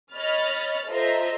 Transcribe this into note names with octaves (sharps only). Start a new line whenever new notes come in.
C#5 D#5 B5 F6 A6
F4 A4 C5 D#5 E5 A#5